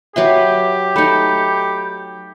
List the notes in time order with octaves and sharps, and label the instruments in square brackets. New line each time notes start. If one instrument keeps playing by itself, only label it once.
[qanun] F#3 B4 C6 [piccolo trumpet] G4 [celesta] E5
[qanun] A3 D#4 [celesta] B5 G6 C#7